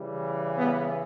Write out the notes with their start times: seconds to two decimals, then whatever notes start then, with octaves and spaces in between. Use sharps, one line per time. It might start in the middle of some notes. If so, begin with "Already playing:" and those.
Already playing: C#3 E3 G3
0.58 G3 B3